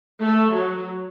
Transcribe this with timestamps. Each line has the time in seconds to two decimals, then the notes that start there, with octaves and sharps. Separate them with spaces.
0.23 A3
0.54 F#3